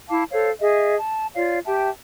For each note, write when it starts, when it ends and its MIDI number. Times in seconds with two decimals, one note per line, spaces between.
0.08 0.23 64
0.08 0.23 77
0.08 0.23 81
0.08 0.23 86
0.32 0.50 69
0.32 0.50 72
0.32 0.50 73
0.32 0.50 77
0.60 0.96 68
0.60 0.96 75
0.60 0.96 76
0.98 1.26 81
1.35 1.59 65
1.35 1.59 73
1.35 1.59 74
1.35 1.59 77
1.65 1.89 67
1.65 1.89 76
1.65 1.89 79
1.65 1.89 81